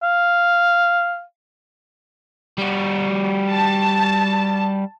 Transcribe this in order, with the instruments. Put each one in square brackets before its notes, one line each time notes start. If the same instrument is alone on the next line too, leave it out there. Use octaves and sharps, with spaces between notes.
[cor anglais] F5
[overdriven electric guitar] G3 F#4
[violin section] A5